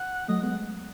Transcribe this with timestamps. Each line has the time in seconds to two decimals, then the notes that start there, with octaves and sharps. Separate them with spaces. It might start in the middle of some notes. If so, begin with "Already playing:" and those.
Already playing: F#5
0.28 F#3 A3 D#5
0.42 G#3 B3 F#5